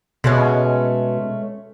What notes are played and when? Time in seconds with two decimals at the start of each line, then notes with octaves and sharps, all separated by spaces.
0.24 B2 G#3 A3 C#4